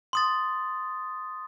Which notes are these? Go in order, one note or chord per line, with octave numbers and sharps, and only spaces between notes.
C6 D#6 A6